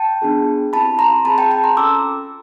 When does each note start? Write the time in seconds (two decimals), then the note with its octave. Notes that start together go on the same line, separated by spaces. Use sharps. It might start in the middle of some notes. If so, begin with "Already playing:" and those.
Already playing: G5 A5
0.22 B3 D4 F4 G#4
0.73 C4 E4 G4 A5 B5
0.99 A#5 C6
1.25 C4 F4 G#4 A5 B5
1.38 G5 A5
1.51 G5 A5
1.64 A#5 C6
1.77 C#4 F4 A4 D6 E6